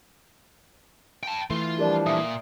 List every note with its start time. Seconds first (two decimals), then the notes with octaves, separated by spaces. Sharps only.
1.23 G5 A5
1.50 E3 A3 F4
1.78 F3 G3 D4 G4 A#4 D5
2.06 A#2 E5 D#6